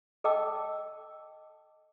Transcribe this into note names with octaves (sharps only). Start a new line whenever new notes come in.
A4 D#5 G5 A5 D6 E6